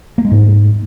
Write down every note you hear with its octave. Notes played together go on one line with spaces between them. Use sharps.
A#3
G#3
G#2